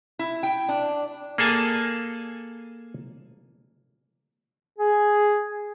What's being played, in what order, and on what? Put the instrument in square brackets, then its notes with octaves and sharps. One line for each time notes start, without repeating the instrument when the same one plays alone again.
[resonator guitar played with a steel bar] E4
G5
D4
[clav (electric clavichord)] A#3 G#4 A4 G#5 A5
[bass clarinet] G#4